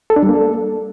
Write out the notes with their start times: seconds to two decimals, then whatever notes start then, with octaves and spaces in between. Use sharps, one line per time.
0.10 A4
0.16 D4
0.23 G3
0.29 A#3
0.35 A4